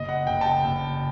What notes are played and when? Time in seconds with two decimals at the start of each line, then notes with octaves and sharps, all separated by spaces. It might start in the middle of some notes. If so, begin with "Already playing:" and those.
Already playing: F#1 D#5
0.09 F#5
0.27 F#1 G5
0.41 A5
0.46 G5
0.64 F#1